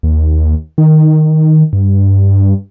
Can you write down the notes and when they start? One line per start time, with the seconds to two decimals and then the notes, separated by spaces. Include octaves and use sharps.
0.03 D#2
0.78 D#3
1.73 G2